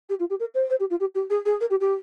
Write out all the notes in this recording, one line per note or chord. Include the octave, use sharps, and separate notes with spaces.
G4
F4
G4
A#4
C5
C5
G4
F4
G4
G4
G#4
G#4
A#4
G4
G4